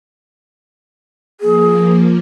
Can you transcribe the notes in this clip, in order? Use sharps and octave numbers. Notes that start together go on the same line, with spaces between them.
F3 A#3 G#4